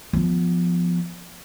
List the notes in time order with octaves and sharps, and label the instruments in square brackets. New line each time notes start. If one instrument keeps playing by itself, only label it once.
[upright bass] F3 B3